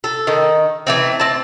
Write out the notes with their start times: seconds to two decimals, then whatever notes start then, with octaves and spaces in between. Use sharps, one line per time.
0.04 A4
0.27 D#3
0.87 E3 A3 C4
1.20 C4 A5